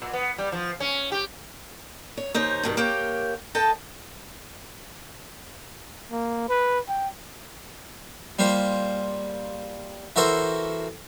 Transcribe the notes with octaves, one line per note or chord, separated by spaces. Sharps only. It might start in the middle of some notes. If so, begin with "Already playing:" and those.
A#2
B3
G3
F3
C#4
G4
C#5
D#2 D#4 C5 C#5
G2 B2 D#3
A#3 G4 C#5 G5
A4 D#5 G5 A5
A#3
B4
G5
G3 A#3 F4 C5
E3 F#4 A4 A#4 C5